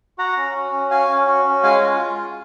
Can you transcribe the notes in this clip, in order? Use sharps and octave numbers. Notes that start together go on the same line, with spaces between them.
F#4 F#5 A#5
C#4
F#4
C#4
F#4 F5 G#5
C#4
F#4
C#4
G#3 F5 G#5
F4